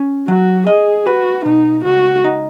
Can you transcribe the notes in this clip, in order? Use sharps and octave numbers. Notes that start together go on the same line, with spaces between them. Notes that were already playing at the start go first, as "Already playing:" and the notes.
Already playing: C#4
F#3 F#4
G#4 D#5
F#4 B4
B2 D#4
C#2 F#4
D#4